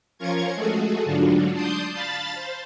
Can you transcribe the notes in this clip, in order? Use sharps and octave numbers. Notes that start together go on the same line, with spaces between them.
F3 C#4 F4 A#4 C#6 G#6
G#3 A3 F#4 G#4 A4
G#2 D3 F#3 D4 F4 F#4
D5 A5 C6 D#6 G6
F5 A5 B5 A6
C5